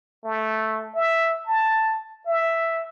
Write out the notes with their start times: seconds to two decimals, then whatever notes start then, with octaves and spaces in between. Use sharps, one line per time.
0.24 A3
0.95 E5
1.47 A5
2.26 E5